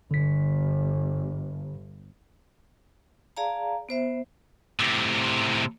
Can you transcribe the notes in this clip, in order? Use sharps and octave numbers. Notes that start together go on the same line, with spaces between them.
G1 D3 B6
G#4 D5 F5 A5 A#5
B3 C5 E5
A2 C3